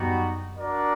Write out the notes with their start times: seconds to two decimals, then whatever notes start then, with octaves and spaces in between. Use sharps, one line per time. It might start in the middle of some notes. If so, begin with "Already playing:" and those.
Already playing: F#2 G3 B3 D#4 F#4
0.56 D4 F#4 A#4 D5